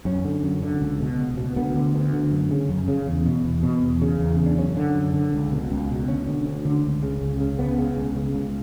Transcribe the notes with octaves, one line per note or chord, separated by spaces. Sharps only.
F#2 C#4
D3
F#2
D3
C#2
B2
C#2
B2
D2 B3
D3
D2
D3
F#2
C#3
F#2
C#3
E2
B2
E2
B2
E2
C#3
E2
C#3
D4
F#2 C#4
D3
F#2
D3
C#2
B2
C#2
B2
D2 C#4
D3
D2
D3
C#2
C#3
C#2
C#3
C#2 B3
C#3
C#2
C#3
C#2